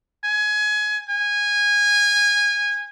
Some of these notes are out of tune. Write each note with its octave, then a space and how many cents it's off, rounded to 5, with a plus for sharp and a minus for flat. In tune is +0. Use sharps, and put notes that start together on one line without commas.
G#5 +20
G#5 -20